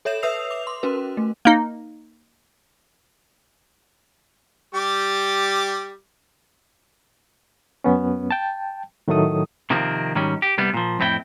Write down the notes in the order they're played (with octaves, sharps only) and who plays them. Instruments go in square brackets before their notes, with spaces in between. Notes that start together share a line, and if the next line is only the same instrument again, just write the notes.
[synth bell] A4 C#5 E5 G6 E7
B4 E5 D#6 E6 C7 F7
D6 F7
C6
C#4 F#4 A#4 B4
A3
[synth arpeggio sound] A#3 D#4
[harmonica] G3 G4 D6
[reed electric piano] F#2 B3 C#4
G5 A5
A2 D#3 F#3 A3 A4 D#6
[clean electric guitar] C3 D#3 F3 A#3 C4
G#2 D#3 F#3 G3 C#4
G4
C2 C3 G3 B3
A#2 F3
F2 A2 C4 E4 B4 G5